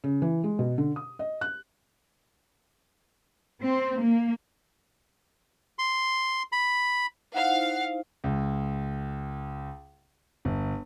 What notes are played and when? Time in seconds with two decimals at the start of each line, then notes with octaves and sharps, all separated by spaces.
0.04 C#3
0.22 E3
0.44 G#3
0.59 B2
0.78 D3
0.96 D#6
1.19 D#5
1.41 F#6
3.62 C4
4.01 A#3
5.79 C6
6.52 B5
7.34 D#4 E4 C5 F5 F#5
8.24 C#2
10.45 G1